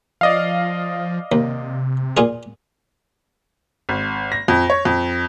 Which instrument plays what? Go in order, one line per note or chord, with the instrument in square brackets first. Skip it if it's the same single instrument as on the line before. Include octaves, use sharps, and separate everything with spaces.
[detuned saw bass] F3 [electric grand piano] D5 D#5 F5
[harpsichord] D#2 [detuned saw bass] C3
[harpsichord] A#2 F4 G#4
[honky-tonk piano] G#1
A#6
F2
C#5
F2